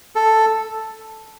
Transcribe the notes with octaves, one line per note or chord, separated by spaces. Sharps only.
A4